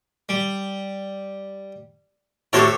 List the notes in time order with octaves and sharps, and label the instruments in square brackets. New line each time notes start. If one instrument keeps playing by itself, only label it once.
[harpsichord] G3
[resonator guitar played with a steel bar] A2 F#4 G4 [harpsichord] A4 C5 C#5